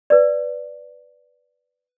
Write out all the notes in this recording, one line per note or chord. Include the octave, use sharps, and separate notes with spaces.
B4 D5